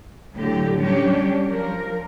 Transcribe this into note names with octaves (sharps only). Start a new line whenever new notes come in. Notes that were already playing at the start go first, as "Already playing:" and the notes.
A2 D3 F#3 G4
F#3 G3 C#4 D4 G4 C#5
F3 A#4